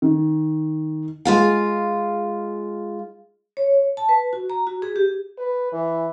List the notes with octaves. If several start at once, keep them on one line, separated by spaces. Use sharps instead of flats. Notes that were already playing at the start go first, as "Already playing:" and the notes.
D#3
G#3 F4 F5
C#5
A5
B4
F#4
A#5
F#4
G#4
G4
B4
E3